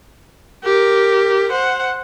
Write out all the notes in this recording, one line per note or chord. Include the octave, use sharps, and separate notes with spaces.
G4 A#4
C5 F#5